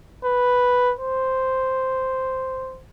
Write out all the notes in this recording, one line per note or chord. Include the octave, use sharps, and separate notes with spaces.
B4
C5